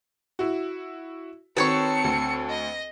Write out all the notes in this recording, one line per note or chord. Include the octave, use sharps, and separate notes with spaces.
E4 F#4
D#3 C4 F#4 A4 B4 C#5 C#6 C#7
D2
D#5